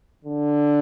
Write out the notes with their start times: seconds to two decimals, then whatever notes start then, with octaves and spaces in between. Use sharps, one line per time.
0.24 D3